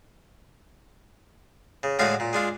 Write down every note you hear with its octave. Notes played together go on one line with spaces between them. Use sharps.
C#3
A2 D3 G#3 A3 F#4 F5
A#2
G#3 D4 F4